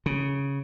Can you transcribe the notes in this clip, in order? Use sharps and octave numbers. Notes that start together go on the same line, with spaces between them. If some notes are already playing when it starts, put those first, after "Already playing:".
C#3